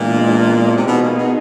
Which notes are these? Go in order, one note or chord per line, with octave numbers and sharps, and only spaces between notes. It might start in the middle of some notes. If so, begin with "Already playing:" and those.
Already playing: A#2 E3 G#3 B3 D4
C3
B2 B3 D#4 G#4
A#2
B2